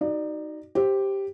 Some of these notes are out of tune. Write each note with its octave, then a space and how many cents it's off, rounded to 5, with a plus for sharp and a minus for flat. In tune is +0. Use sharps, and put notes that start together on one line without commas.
D#4 +0 F#4 +15 D5 +25
G4 +0 C5 +10